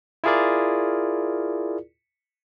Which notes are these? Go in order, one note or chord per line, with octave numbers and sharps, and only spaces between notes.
E4 F4 G#4 A#4 D5